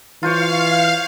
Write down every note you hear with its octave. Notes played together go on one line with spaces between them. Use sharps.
E3 F4 C5 C#5 F5